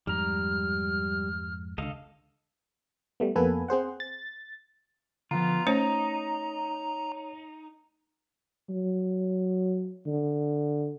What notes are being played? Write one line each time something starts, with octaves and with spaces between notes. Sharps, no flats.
F2 G#2 G3 A#5 F6
C#2 D3 A4 D#5 F5
G3 A3 B3
F2 A#3 B3 A4 B4 G#5
C4 G#4 C5 F#5
A6
D3 F3 B3 F4 A#5
A3 C#4 D#4 C5 C#5
F#3
D3